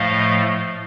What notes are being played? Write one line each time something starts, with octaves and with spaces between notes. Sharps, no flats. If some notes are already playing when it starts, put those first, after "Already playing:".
Already playing: A2 F3 A3 D#5 F5